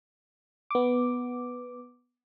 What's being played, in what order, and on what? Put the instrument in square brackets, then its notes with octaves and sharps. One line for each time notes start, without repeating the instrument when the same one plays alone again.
[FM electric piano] B3 D6